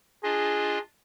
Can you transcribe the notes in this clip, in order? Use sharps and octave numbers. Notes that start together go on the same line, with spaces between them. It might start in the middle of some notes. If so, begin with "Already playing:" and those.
D4 F4 G#4 D#5